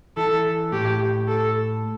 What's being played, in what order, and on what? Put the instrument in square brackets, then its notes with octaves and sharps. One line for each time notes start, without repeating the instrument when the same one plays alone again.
[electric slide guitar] E3 [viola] A4
[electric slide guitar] A2 [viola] G4
[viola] A4